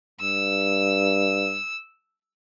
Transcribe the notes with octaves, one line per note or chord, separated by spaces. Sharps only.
G2 E6